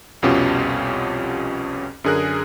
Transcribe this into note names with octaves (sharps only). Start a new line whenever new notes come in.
C2 F2 B2 C#4 F4 G4
F#2 D3 G#4 A#4 F#6